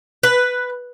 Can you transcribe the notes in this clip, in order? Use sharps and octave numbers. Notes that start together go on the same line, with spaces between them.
B4